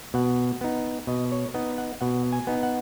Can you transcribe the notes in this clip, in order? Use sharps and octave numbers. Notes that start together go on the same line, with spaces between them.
B2 F#5
B3 D#4
B2 D#5
C#5
B3 D#4 D#5
F#5
B2 F#5
G#5
B3 D#4
F#5